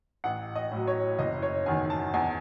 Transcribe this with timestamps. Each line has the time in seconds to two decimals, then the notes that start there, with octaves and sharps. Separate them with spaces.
0.24 A1 F#5
0.56 D#5
0.72 A2 F#3
0.87 C#5
1.19 F#1 D#5
1.42 C#5
1.66 E2 D#3 G#5
1.90 A5
2.14 E2 G#5